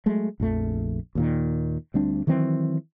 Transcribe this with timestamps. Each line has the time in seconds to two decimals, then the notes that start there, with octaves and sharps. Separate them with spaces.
0.06 F#3 G#3 A3
0.40 A#1 F2 A3
1.15 D#2 A#2 D#3
1.94 D2 G3 C4 D4
2.27 D#3 E3 F#3 C4